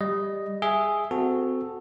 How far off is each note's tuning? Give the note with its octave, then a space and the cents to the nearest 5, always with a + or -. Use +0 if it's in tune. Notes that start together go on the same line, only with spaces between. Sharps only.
G3 +15 D#5 +0
G#4 +0 E5 +0
C4 -25 F#4 -10 A4 +0